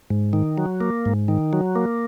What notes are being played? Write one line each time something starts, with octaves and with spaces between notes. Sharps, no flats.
G#2
D#3
F#3
A#3
G#2
D#3
F#3
A#3